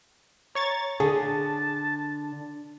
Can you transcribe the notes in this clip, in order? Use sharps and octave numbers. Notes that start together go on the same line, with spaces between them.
C#5 A#5 C#6 A6
D3 G#4 A5